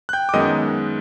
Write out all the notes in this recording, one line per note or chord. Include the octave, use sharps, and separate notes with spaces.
F#6
G5 G6
D6
F#2 D#3 G#3 B3 D#5 D#6